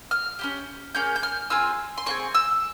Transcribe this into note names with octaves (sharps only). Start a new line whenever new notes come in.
F6
C#4 E4 G4
A#3 C#4 G#4 G6
G6
F6
C4 F4 G#4 E6
C6
C4 F4 G#4 C#6
E6